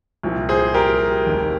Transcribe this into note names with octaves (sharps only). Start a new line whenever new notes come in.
C2 A#2 F3
G#4 C5
G4 A#4
F1 D#2 D#3